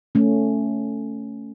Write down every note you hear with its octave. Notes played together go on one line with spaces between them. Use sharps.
A3 C#4